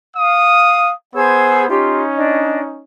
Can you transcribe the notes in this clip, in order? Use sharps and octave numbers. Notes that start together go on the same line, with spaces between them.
F5 D#6
B3 G#4 C5 E6 G#6
C#4 D#4 F4 G4
D4 D#5